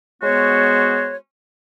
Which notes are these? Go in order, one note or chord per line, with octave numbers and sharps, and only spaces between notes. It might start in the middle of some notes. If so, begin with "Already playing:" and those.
G#3 B3 F#4 C5 C#5